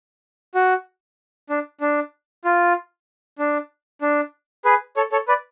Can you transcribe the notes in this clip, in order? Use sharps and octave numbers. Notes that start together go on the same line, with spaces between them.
F#4
D4
D4
F4
D4
D4
G#4 B4
A4 C#5
A4 C#5
B4 D5